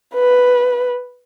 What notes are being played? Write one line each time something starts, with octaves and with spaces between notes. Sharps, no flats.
B4